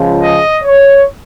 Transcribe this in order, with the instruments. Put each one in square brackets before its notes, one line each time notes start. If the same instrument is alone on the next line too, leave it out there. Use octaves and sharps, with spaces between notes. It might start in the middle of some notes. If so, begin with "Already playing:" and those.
Already playing: [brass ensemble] C#2 C#3 F3
D#5
C#5